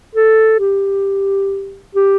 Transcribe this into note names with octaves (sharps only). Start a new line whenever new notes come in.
A4
G4
G4